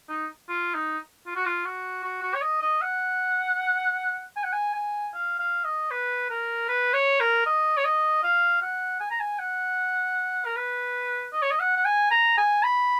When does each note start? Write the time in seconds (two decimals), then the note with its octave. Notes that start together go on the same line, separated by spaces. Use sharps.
0.09 D#4
0.49 F4
0.75 D#4
1.27 F4
1.36 F#4
1.46 F4
1.65 F#4
2.04 F#4
2.23 F#4
2.34 C#5
2.42 D#5
2.62 D#5
2.82 F#5
4.36 G#5
4.44 F#5
4.53 G#5
4.74 G#5
5.14 F5
5.40 F5
5.65 D#5
5.91 B4
6.31 A#4
6.69 B4
6.94 C#5
7.20 A#4
7.46 D#5
7.78 C#5
7.85 D#5
8.23 F5
8.62 F#5
9.01 G#5
9.11 A#5
9.20 G#5
9.39 F#5
10.46 A#4
10.57 B4
11.33 D#5
11.43 C#5
11.51 D#5
11.60 F#5
11.77 F#5
11.86 G#5
12.11 A#5
12.38 G#5
12.64 B5